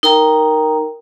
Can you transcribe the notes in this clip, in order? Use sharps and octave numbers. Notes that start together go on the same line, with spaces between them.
D#4 A#4 G5 A#5